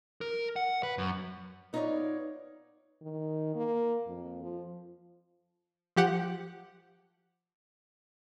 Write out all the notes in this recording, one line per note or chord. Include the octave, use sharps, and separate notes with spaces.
A#4
F#5
B4
F#2
B3 D#4 F4 A4 C#5 D5
D#3
A#3
F2
F3
F3 G4 F#5